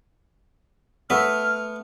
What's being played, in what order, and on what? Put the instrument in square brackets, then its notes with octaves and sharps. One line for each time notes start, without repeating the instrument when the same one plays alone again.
[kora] A3 E5 [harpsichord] B3 [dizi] F6